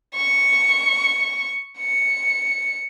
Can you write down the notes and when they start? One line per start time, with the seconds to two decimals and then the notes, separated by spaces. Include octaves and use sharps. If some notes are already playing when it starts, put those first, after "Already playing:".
0.15 C#6
1.80 C#7